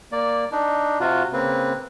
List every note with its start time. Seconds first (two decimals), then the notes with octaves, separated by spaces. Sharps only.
0.12 A#3 D5
0.52 D4 D#4
1.00 C3 F4 F#4
1.33 C#3 A#3 C4 B4